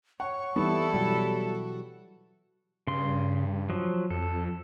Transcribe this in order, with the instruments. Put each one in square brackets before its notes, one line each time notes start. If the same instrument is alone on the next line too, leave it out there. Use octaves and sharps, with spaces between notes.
[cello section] C#5 [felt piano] F#5 [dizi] C#6
[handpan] E3 G3 [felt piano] B3 [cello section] E4 A4
[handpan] B2 F#3 [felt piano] G3 [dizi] F#4
[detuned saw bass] G2 [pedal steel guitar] C#3 C6
[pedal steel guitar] F3 F#3
[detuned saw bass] F2 [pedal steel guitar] A4